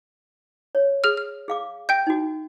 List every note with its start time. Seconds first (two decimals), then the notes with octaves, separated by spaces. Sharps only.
0.75 C#5
1.04 G#4 F6
1.17 F6
1.48 G#4 F5 D6
1.89 E5 G5 G6
2.07 D#4 F#4